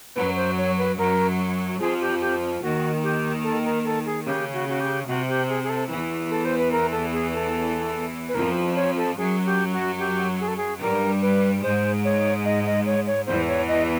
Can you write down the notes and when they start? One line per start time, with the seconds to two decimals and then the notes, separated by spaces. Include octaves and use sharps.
0.16 F#2 F#3 B4
0.36 C5
0.57 C#5
0.78 B4
0.98 F#2 F#3 A#4
1.79 F2 F3 G#4
2.01 G4
2.21 G4
2.62 D#2 D#3 F#4
3.03 G4
3.44 A4
3.64 A#4
3.85 A4
4.06 G#4
4.26 C#3 G4
4.53 F#4
4.69 F#4
4.80 G4
5.07 C3 F#4
5.28 G4
5.49 G#4
5.64 G#4
5.69 A4
5.90 E2 E3
6.30 A4
6.45 C5
6.58 B4
6.72 A#4
6.92 A4
7.13 G#4
7.34 A4
8.29 B4
8.35 F2 F3 A#4
8.76 C#5
8.97 A4
9.17 F#2 F#3 G#4
9.45 G4
9.72 F#4
9.99 G4
10.40 G#4
10.48 A4
10.57 G#4
10.81 G2 G3 A#4
11.22 B4
11.63 G#2 G#3 C5
12.05 C#5
12.45 D#5
12.66 D#5
12.86 C#5
13.07 C#5
13.27 E2 E3 C5
13.48 C#5
13.68 D#5